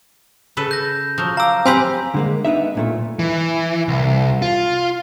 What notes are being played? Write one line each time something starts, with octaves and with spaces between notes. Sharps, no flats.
C#3 A4 B4
G6 A#6
F3 F#3
F5 A#5 D6 E6
C4 G4 B4 F5 G#5 C6 E6
D3 G#3 A#3
B3 D4 D#4 E5
B1 A#2 A3
E3
C2
F4